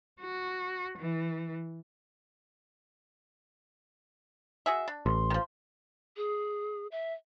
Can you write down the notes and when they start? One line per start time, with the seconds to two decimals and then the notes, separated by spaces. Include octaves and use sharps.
0.21 F#4
0.98 E3
4.66 F#4 G#4 E5
4.88 D4
5.06 A1 C6
5.30 D#3 F3
6.17 G#4
6.92 E5